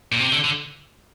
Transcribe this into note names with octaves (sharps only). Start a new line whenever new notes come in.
A#2
C3
D3
D3